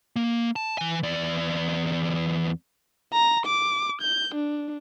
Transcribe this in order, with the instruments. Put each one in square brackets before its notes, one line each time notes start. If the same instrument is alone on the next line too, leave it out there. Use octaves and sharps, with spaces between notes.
[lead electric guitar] A#3
A5
E3 G#5
E2 D5
[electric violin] A#5
D6
G6
D4